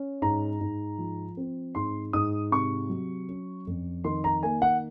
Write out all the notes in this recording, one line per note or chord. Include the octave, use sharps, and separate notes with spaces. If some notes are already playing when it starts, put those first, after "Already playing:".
Already playing: C#4
G#2 A#5
G#2
F3
C4
G#2 C6
G#2 D#6
C3 C#6
F#3
C#4
F2
D#3 C6
A#5
A#3 G#5
F#5